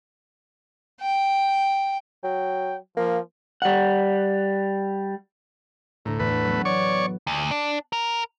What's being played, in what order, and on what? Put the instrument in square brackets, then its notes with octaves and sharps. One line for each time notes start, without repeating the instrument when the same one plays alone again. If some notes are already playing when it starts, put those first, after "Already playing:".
[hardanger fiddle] G5
[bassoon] F#3 [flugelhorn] G5
[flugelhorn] F3 [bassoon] A#3
[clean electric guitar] G3 F#5
[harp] D2 A#5 [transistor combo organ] A2
[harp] E2 A2 [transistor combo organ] A3 B4
[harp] F#3 B3
[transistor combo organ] C#5 D5 C#6
[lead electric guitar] D2
D4
A#4